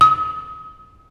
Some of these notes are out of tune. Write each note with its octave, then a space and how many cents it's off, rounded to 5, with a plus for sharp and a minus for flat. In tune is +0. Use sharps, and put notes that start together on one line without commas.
D#6 +35